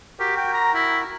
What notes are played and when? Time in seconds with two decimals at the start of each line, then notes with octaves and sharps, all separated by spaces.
0.19 F#4 G4 A#4
0.37 G5
0.53 A#5
0.74 E4